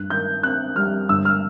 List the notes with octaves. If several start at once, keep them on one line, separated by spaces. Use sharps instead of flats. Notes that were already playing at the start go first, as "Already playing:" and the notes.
Already playing: G2 F#6
D#3 G6
C4 F#6
G3 F6
G1 E6
F6